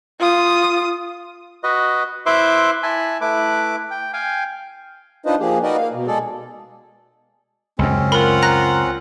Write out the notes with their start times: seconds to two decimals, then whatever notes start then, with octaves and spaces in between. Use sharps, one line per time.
0.20 F4 D#6
1.63 F#4 B4 D#5
2.26 E4 B4 C5 E5 C6 D6
2.83 E4 G#5 A5 B5
3.21 A3 E4 B4 D6
3.91 G5
4.13 F5 G5 G#5
5.26 D4 D#4 F4 B4 C5 D#5
5.40 F3 A#3 G4 G#4
5.63 D#4 F#4 A#4 B4 D5 D#5
5.77 A#3 F5
5.93 B2
6.07 G#3 G#4 A4 D5
7.79 C#2 F#2 C4 C#4
8.12 F4 A#4 F#5 B5
8.42 A#5 F#6 A#6